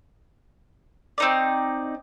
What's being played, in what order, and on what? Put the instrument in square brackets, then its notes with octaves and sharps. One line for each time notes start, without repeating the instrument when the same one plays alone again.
[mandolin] C4 D#4 D5